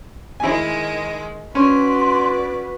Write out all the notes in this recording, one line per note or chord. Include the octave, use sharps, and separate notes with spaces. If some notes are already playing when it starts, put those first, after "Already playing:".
D#3 G#3 E4 G#5
C#4 F#4 B4 D5 C6